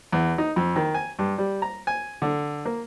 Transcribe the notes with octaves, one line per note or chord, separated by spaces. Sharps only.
E2
D#4
F2
D#3
G#5
G2
G3
A#5
G#5
D3
A#3